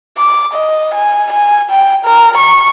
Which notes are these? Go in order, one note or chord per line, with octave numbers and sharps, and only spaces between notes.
D6
D#5
G#5
G#5
G5
A#4
C#6